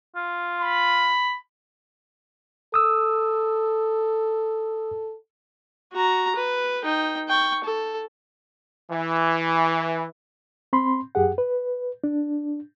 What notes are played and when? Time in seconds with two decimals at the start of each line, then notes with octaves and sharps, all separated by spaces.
0.16 F4
0.61 B5
2.74 A4 D#6 E6
5.93 F#4 A#5
6.36 B4
6.84 D#4 G5
7.29 G5 C#6
7.64 A4
8.90 E3
10.73 C4 B5 C6
11.15 F#2 G4 G#4 F#5
11.38 B4
12.04 D4